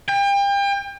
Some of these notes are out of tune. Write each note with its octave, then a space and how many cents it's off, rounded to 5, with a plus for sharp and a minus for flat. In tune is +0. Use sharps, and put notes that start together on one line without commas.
G5 +35